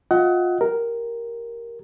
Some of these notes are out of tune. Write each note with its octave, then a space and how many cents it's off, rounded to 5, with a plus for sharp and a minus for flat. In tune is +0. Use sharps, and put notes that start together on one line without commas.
F4 +25 D#5 +35 F#5 +20
G4 -5 A#4 +0